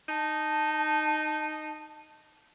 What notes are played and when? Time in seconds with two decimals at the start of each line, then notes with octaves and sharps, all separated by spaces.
0.09 D#4 A5